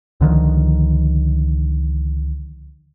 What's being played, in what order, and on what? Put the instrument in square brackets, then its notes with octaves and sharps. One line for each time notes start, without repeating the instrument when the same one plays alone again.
[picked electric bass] C#2 D3 D#3 F3